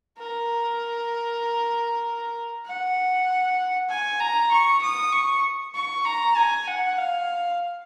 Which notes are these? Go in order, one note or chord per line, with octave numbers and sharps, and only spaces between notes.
A#4
F#5
G#5
A#5
C#6
D#6
C#6
C#6
A#5
G#5
F#5
F5